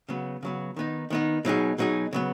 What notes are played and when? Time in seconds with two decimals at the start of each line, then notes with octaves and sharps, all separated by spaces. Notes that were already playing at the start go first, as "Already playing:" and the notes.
0.09 C#3 F#3 B3
0.43 C#3 F#3 B3
0.76 D#3 B3 D#4
1.10 D#3 B3 D#4
1.45 B2 F#3 D#4 G#4
1.78 B2 F#3 D#4 G#4
2.13 C#3 F#3 B3